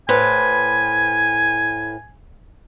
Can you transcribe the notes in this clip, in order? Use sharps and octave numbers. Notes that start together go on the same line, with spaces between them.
A2 B4 C5 G#5